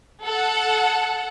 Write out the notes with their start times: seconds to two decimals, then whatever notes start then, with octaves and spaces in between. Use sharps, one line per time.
0.24 A4 F#5